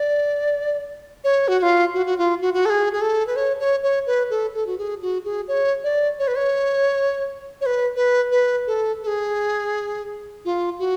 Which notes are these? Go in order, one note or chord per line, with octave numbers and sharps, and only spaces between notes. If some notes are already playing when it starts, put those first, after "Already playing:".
Already playing: D5
C#5
F#4
F#4
F4
F#4
F#4
F4
F#4
F#4
A4
G#4
G#4
A4
B4
C#5
C#5
C#5
B4
A4
A4
F#4
G#4
F#4
G#4
C#5
D5
C#5
B4
C#5
C#5
B4
B4
B4
A4
A4
G#4
F4
F#4